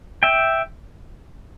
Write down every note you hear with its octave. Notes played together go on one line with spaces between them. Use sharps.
E5 G5